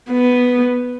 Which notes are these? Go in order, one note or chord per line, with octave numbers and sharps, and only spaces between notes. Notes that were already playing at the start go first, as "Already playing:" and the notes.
B3